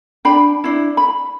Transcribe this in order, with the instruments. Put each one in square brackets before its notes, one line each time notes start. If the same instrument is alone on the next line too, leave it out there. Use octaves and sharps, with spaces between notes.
[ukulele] D4 G5 B5
D4 E4
B5